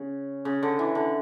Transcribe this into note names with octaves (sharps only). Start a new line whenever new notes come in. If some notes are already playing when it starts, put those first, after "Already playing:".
Already playing: C#3
C#3
D3
E3
D3